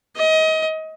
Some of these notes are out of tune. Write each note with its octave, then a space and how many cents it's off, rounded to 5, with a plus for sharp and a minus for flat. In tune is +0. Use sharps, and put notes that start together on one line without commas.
D#5 +30